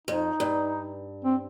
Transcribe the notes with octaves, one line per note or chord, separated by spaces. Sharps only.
F2 D#4
G2
C4